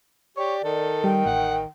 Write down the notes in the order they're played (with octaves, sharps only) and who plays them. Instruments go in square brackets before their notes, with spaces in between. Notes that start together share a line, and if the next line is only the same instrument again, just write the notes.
[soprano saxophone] G4 [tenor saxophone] C#5 [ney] D5
[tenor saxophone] D#3 [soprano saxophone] A4
[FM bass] G3 [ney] G5
[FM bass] A1 [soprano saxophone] F#5